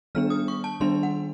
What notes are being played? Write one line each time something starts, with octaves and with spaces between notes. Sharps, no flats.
D#3 G3 B3 D4 F6
D#6
C#6
A5
D#3 G3 B3 D4 C6
F#5